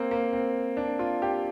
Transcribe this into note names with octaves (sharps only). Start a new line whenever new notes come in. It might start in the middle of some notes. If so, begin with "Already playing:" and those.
Already playing: A#3 C4
A#3
C4
D4
F4
G4